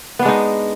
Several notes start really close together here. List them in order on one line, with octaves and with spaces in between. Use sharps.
B3 D4 G#3 D#4